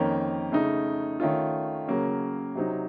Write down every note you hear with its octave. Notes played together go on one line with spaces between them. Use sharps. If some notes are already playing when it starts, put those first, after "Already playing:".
Already playing: F2 D#3 A#3 C#4
C#3 A3 D#4
D#3 A3 C#4 F4
C#3 F#3 A#3 C#4
C3 F#3 C4 D#4